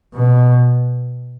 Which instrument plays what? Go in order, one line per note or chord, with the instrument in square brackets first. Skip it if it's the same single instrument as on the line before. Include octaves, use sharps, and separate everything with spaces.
[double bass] B2